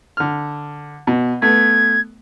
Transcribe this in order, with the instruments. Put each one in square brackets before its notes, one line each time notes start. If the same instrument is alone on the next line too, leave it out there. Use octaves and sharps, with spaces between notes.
[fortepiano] D3 F6
B2
[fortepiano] A3 B3 [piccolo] G#6